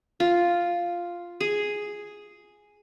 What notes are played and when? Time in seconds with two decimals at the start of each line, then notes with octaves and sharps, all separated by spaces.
0.20 F4
1.41 G#4